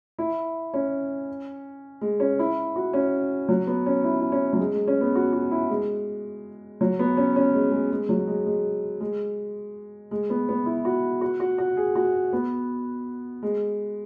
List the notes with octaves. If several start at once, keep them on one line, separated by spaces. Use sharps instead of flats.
E4
C#4
G#3
C#4
E4
F#4
C#4
F#3
B3
C#4
E4
E4
C#4
F#3
G#3
G#3
C#4
B3
F#4
F#4
E4
G#3
F#3
B3
C#4
C#4
G#3
G#3
G#3
F#3
G#3
G#3
G#3
G#3
B3
B3
E4
F#4
F#4
F#4
F#4
G#4
F#4
B3
G#3